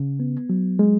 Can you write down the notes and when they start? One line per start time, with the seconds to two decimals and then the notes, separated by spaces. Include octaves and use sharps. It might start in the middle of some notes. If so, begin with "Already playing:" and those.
Already playing: C#3
0.20 B3
0.49 F#3
0.79 G#3